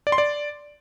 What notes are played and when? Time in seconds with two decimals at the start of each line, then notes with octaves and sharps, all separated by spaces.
0.07 D5
0.12 C6
0.18 D5